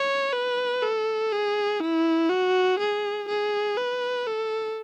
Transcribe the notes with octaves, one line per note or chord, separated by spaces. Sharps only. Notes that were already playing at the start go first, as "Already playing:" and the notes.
Already playing: C#5
B4
A4
G#4
E4
F#4
G#4
G#4
B4
A4